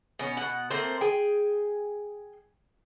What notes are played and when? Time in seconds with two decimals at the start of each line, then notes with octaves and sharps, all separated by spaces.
0.19 B2 C#4
0.37 B2 F#5
0.70 A3 A#3 C4 C5
1.01 G#4 G5 G#5